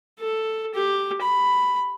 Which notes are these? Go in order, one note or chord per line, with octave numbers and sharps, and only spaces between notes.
A4
G4
B5